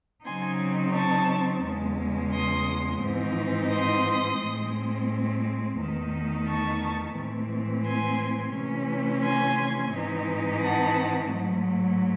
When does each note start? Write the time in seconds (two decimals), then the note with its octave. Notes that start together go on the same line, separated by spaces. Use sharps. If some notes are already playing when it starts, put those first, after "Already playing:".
0.25 C#3 F#3 C4 D#4 G#5 C6
0.94 A5 C#6
1.64 E2 C#3 G#3
2.32 C6 D#6
3.02 G#2 E3 C4 D#4
3.70 C6 D#6
4.40 A2 G#3 C4
5.79 E2 D#3 A3 D#4
6.47 A5 C#6
7.16 A2 E3 G#3 C4
7.85 G#5 C6
8.55 C3 E3 A3 C#4
9.24 G#5 C6
9.93 G#2 E3 C4 D#4
10.62 F#5 A5
11.31 G#2 F#3 A3